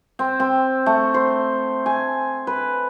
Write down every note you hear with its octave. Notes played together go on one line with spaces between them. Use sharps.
C4
C4
A3
C5
G#5
B4